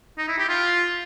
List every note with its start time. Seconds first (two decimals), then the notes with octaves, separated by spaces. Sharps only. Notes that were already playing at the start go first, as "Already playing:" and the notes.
0.18 D#4
0.28 E4
0.38 G4
0.49 F4